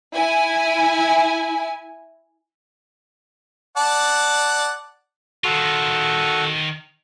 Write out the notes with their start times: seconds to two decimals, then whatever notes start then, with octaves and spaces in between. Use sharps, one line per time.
0.14 E4 G#5
3.77 D5 F#5 A5
5.44 D#3 F4 F#4 A4 C#6